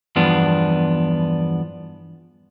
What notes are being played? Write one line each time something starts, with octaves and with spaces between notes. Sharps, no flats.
E2 G2 F3 B3 D4